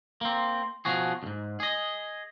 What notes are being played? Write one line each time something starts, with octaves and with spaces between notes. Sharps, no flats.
A#3 C4
B2 F3 F#4 G#4
D2 G#2
G#4 D#5